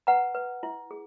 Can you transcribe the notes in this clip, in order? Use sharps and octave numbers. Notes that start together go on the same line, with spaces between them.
B4 F#5 A#5
B4
E4
G#4